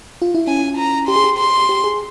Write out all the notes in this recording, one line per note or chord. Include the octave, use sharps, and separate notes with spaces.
F4
E4
C#4 G#5
A#5
G4 C6
G#4
G4
C6
G4
G#4